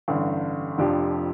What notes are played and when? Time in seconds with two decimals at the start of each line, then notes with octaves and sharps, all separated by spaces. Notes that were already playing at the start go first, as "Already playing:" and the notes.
0.08 A1 G2 D3
0.78 F1 F2 F3 D4 G4